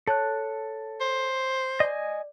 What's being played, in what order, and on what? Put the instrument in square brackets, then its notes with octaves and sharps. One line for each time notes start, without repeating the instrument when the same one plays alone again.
[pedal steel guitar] A4 F#6 [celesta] C#5 A5
[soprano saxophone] C5
[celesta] D5 [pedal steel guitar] D#5 G#5